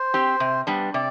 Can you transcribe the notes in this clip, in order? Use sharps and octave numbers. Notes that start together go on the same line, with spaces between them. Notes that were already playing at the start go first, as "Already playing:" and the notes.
Already playing: C5
C4 G4
C3
G3 B3 D4
C3 D5